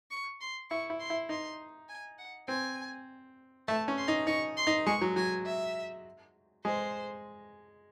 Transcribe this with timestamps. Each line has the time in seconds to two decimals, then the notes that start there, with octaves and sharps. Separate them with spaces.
0.11 C#6
0.41 C6
0.70 E4 C#6
0.90 E4
1.00 C6
1.10 E4
1.29 D#4 C6
1.89 G#5
2.18 F#5
2.48 C4 G#5
3.68 A3 A5
3.88 C#4
3.97 C6
4.08 D#4
4.27 D#4 C#6
4.57 C6
4.67 D#4
4.87 G#3 C#6
5.01 F#3
5.16 F#3 G#5
5.46 E5
6.65 G#3 C5